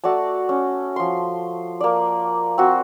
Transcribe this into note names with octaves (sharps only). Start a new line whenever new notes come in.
A3 F#4 D5 A5
C#4
F3 C6
A#3 D5
C4 F#4